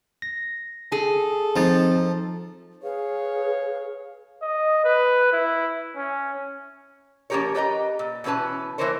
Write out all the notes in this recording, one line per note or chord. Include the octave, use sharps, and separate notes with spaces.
A#6
G#4 A4
F3 C4 D#4 A6
G#4 B4 C#5 F5
D#5
B4
E4
C#4
F3 A#3 C#4 G4 A#4 C#5
G4 B4 D#5 A#5
A#2
B2 E3 C#4 B4 A5
E3 F3 A#3 A#4 C5 C#5